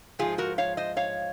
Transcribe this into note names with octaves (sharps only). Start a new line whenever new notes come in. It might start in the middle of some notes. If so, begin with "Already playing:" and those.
G#2 F3 F4 G#4
F#4 A#4
C#5 F5
C5 D#5
C#5 F5